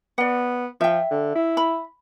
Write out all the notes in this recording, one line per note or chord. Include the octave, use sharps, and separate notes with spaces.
B3 D5 F#5
F3 E5 G5
D3
E4
B5